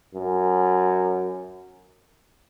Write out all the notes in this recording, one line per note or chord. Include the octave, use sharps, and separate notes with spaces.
F#2